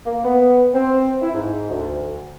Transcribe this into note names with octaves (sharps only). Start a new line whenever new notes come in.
A#3
B3
C4
E4
G#2
D2